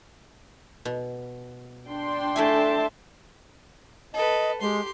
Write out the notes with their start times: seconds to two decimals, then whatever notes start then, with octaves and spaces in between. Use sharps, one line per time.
0.85 B2
1.88 D4 G5 C6
2.36 A3 E4 E5 G#5 A5
4.14 A4 B4 D#5
4.61 G#3 G4 C6